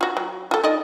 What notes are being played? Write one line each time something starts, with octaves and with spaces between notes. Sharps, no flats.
F4 F#4
F#3
F4 A4
D#4 D5 D#5